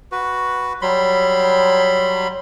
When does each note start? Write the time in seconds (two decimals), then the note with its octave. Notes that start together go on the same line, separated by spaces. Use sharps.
0.12 F#4 B4
0.82 F#3 G3 B5 C6